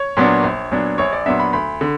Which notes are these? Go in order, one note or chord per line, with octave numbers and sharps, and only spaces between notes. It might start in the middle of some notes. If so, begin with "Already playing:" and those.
Already playing: C#5
A#2 F#3 B3 D4
A#1
A#2 F#3 B3 D4
A#1 C#5
D5
A#2 F#3 B3 D4 E5
B5
D2 B5
D3